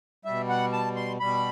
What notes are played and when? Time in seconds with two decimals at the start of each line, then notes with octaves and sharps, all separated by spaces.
0.25 B2 G3 E5
0.49 F#5
0.73 A5
0.96 C6
1.20 B2 G3 B5